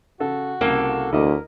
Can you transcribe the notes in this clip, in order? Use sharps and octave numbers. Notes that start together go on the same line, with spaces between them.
C#3 F#4 A4
C2 C#3 A#3 A4 F5
D2 E4 A#4 D#5 D6